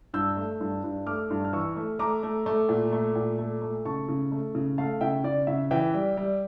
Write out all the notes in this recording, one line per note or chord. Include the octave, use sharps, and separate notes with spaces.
G2 E6 G6
A3
G2
G2
A3 D6 F6
G2
F6
E3 C#6 E6
A3
A3 A#5 D6
A3
A3
A#2
A3
A#2
A3
A3
C#3 A5 C#6
C#3
A3
C#3
A3 F5 A5
C#3 E5 G5
C#3 D5
C#3 E5
E3 E5 G5
G3
G3